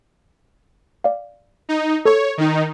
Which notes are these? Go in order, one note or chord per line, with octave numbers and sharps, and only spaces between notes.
D5 F5
D#4
A4 C#5 C#6
D#3 D#4